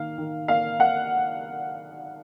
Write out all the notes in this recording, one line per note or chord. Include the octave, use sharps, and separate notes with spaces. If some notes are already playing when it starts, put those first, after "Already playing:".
Already playing: D#3 A#3 F5
D#3
A#3 F5
A#3 F#5